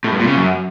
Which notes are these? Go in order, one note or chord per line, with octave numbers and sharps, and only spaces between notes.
A2
G2
A#2
C#3
F#2